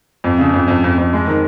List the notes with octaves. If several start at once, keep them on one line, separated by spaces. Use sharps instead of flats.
F2
C#3
F2
F2
F2
F2
G#3
D#3